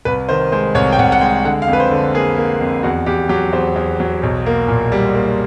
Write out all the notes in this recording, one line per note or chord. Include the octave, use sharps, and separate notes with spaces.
C2 B4
D#3 C5
G#3 C5
C2 C#5
G5
C2 F#5
F#5
G#3 G5
D3 F#5
F5
F2
B4
C5
D3
A#3 G#4
A#3
F2
E2 F#4
E2 G4
F#3 G4
E2 C5
E2
F#3
B1
A#3
A#2
G3
A#3